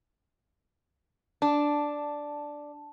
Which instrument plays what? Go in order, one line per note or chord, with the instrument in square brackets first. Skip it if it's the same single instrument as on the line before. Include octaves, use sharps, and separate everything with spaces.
[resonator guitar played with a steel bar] D4 [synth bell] A5